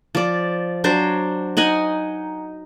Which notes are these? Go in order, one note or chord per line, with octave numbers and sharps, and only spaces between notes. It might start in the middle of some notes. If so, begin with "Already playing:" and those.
F3 D5
F#3 D4 C5
D#4 D#5 F#5 G#5